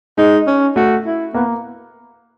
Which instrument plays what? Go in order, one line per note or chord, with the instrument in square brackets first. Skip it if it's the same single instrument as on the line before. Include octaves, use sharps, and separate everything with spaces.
[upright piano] G#3 [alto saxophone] D#4
[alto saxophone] C#4
[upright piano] A3 [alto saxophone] F#4
[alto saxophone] E4
[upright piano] A#3 [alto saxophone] B3